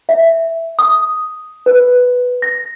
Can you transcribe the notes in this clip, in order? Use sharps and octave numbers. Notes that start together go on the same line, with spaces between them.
E5
D#6
B4
A#6